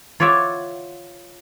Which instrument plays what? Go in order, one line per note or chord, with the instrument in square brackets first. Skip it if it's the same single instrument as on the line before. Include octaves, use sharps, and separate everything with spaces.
[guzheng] F4 C#5 D5 E5 F#5